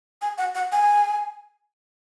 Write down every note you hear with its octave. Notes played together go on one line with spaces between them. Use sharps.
G#5
F#5
F#5
G#5